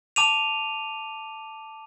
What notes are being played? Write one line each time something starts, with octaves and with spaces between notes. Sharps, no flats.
A5 D6 D#7 F7